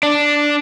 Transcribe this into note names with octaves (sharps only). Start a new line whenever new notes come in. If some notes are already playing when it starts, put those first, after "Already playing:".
D4